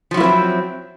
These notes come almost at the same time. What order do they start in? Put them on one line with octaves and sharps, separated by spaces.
F3 F#3 E4 A#3 C4